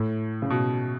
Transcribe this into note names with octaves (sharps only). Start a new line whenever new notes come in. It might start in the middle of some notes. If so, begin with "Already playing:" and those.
Already playing: A2
C#3
B2